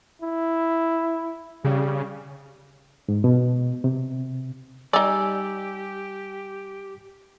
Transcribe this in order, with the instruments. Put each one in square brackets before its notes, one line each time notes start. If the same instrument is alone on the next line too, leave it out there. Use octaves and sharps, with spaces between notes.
[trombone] E4
[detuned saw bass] C#3 [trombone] G3
[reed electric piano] G#2
B2
C3
[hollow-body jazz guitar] G3 [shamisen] D#4 D5 [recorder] G4 [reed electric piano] G#5 E6